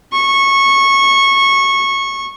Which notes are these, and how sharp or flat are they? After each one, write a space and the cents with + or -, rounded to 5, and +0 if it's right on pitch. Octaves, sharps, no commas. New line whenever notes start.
C#6 -15